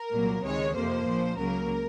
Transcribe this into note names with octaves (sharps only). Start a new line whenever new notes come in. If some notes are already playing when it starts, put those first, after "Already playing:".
Already playing: A#4
C2 A#2 F#3 A#3
C#2 C3 D#3 G#3 C#5
F2 C3 F3 A#3 C5
A#1 A#2 F3
C#2 C#3 F#3 A#3 A#4